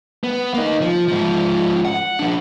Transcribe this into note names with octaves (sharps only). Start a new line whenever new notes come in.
B3
A#3 D#4
F3
G#2 F3
F#5
F3 D4